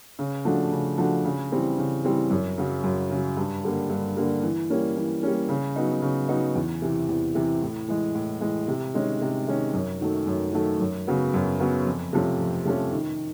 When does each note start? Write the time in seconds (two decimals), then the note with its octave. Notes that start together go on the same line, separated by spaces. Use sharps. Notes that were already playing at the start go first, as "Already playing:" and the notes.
0.19 C#3
0.45 F3 A3 D4 F#4
0.72 C#3
0.98 F3 A3 D4 F#4
1.25 C#3
1.52 E3 G3 C4
1.78 C#3
2.05 E3 G3 C4
2.30 F#2
2.58 C#3 F#3
2.84 F#2
3.10 C#3 F#3
3.37 G2
3.64 D3 G3 A#3
3.90 G2
4.17 D3 G3 A#3
4.43 E3
4.70 G3 A#3 C#4
4.96 E3
5.23 G3 A#3 C#4
5.49 C#3
5.76 F#3 B3 D#4
6.02 C#3
6.29 F#3 B3 D#4
6.55 E2
6.82 C3 E3
7.09 E2
7.35 C3 E3
7.62 A2
7.88 E3 G#3
8.15 A2
8.41 E3 G#3
8.68 C3
8.94 D#3 G#3 C#4
9.21 C3
9.48 D#3 G#3 C#4
9.73 F#2
10.01 D#3 F#3 A3
10.26 F#2
10.53 D#3 F#3 A3
10.80 F#2
11.07 C#3 F#3 B3
11.34 F#2
11.60 C#3 F#3 B3
11.87 F2
12.13 C3 F3 A3 C#4
12.40 F2
12.65 C3 F3 A3 C#4
12.92 D#3